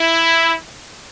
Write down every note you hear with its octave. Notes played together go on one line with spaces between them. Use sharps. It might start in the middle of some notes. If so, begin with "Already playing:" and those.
Already playing: E4